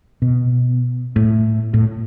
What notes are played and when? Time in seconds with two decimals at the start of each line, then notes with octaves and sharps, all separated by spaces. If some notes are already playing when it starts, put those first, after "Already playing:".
0.22 B2
1.16 A2
1.74 A2